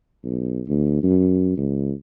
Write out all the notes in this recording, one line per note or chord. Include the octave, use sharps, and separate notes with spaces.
B1
D2
F#2
C#2